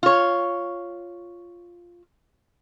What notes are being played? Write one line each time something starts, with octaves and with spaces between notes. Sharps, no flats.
F4 C#5